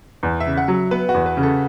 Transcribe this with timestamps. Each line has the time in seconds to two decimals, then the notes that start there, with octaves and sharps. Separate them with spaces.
0.23 E2
0.40 E5
0.46 C#3
0.58 F#5
0.68 F#3
0.91 B3 B4
1.09 F#4
1.14 E2
1.26 B4
1.37 C#3
1.43 A4